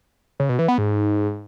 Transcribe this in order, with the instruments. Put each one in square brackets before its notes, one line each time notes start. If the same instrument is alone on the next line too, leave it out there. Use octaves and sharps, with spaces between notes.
[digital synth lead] C#3
B2
E3
B3
G#2